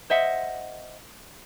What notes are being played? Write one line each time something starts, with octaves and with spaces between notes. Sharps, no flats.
C5 D#5 E5 F#5